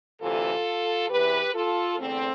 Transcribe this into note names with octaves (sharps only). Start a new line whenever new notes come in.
D2 C3 E3 F4 A4
E2 C3 E3 G4 B4
F4 A4
E2 D3 A3 C4